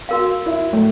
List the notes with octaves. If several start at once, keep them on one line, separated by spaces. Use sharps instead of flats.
F#4 A#4 F5
E4
A2 A3